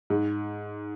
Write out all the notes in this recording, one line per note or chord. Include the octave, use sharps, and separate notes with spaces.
G#2